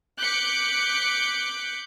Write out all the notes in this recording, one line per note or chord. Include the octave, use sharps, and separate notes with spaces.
D6 F#6 G6 B6 C#7 D7